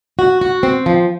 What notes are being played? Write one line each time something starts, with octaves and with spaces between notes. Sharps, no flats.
F#4
F#4
C4
F3